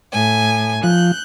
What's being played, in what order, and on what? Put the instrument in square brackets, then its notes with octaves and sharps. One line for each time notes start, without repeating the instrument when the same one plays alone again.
[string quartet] A2 G#5
[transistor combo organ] F3 [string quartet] F#6 G6